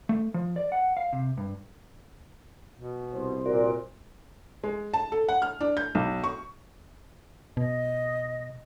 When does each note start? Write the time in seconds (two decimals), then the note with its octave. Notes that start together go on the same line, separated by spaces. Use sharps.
0.09 A3
0.34 F3
0.56 D5
0.72 F#5
0.97 F5
1.13 C3
1.37 G2
2.75 B2
3.14 C2 C5
3.46 A#2 F#4 A#4 D5
4.64 G#3
4.94 A5
5.12 A4
5.29 F#5
5.42 F6
5.61 D4
5.77 G6
5.95 B1
6.24 C#6
7.57 B2 D#5